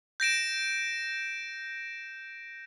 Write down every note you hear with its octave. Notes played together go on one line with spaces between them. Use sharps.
G6 A#6 D7 E7